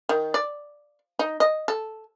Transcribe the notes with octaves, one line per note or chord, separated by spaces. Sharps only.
D#3
D5
D#4
D#5
A4